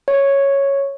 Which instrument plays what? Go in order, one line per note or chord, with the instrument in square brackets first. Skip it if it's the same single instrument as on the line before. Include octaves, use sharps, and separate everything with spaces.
[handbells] C#5